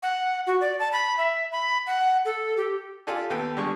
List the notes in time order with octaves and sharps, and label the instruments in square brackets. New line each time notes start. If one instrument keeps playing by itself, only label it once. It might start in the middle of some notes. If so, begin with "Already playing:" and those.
[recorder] F#5
F#4
D5
A5
B5
E5
B5
F#5
A4
G4
[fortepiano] F4 G4 A4 D5 G#5
D#2 B3 A4 G5
D3 G3 G#3 C#6